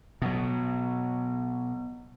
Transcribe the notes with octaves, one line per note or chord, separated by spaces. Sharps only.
B2 F#3